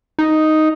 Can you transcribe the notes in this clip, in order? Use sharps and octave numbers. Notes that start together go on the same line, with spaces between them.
D#4